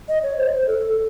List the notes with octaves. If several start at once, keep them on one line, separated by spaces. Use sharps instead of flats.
D#5
C#5
C5
A4